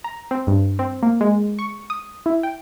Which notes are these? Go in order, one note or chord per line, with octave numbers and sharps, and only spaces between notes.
A#5
C4
G2
C4
A#3
G#3
C#6
D#6
E4
G5